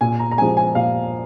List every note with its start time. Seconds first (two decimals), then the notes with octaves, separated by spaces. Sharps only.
0.01 A#2 G#5
0.19 A#5
0.31 A#5
0.38 F3 G#3 G#5
0.57 G#5
0.75 A#2 F5